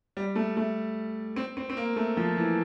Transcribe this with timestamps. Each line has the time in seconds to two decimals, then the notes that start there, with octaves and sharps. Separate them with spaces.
0.17 G3
0.35 A3
0.57 A3
1.36 C4
1.57 C4
1.70 C4
1.77 A#3
1.96 A3
2.17 F3
2.37 E3